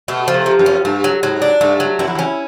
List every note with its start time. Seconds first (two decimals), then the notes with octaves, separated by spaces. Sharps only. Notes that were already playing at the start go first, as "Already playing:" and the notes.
0.08 B2 A3
0.28 F3
0.34 C3
0.46 F3
0.59 F#2
0.66 C#4
0.85 G2 A3
1.04 F#3
1.23 G#2 F#3
1.42 D4
1.61 G2 A3
1.80 F#3
1.99 F#2 E4
2.08 F2
2.15 E2
2.19 C#4